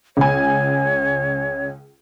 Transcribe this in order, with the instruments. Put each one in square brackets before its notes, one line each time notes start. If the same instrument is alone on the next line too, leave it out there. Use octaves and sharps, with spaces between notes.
[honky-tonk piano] C#2 G#5 [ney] C#5